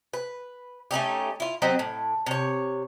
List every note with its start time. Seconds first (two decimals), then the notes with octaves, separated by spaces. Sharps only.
0.13 B4
0.91 A3 C#4 D#4 G4
1.40 E4 F4
1.62 F#3 C4 G4 D#5
1.79 A2
2.26 C3 C#5